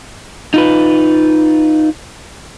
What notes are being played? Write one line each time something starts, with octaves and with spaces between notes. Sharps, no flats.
D#4 F4 B4